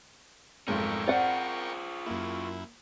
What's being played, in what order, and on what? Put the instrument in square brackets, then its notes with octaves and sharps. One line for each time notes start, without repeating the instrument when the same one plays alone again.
[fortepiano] B1 F2 G#2 [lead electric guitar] A3 C#4 [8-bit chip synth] A#4 G5 C#6
[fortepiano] C4 C5 [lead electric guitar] F4 G#4 [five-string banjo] D5 F#5
[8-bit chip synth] F#2 E4 [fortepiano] A#3